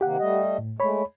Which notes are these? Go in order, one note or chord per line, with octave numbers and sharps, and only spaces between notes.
C3 D#3 A#3 G4 F#5
G3 A3 D#5
A2
G#3 A3 C#5 B5